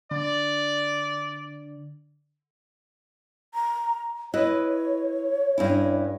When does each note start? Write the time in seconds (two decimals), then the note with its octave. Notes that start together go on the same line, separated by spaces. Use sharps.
0.11 D3 D5
3.54 A#5
4.34 E4 B4 C#5 D#5
5.58 G2 C#4 E4